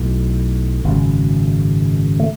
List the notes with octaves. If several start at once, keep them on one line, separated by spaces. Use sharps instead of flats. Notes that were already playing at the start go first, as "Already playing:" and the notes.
Already playing: B1 A2 F#3
G#1 F#2 C#3
A3